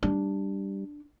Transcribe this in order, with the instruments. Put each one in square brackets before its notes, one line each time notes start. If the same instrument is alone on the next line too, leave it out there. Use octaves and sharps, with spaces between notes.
[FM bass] G3 [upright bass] D4